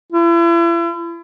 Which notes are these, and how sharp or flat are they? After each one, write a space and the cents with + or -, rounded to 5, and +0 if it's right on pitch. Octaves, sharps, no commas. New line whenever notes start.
E4 +40